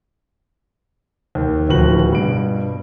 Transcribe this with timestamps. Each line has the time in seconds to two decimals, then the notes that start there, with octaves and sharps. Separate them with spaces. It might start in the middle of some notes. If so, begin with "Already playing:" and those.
1.35 D#2
1.69 D1 D#2 F3 F#4 B4 F#7
2.12 G2 B2 D7